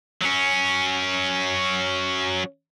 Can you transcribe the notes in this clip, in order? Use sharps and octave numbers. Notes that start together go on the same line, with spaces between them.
F#3 C#4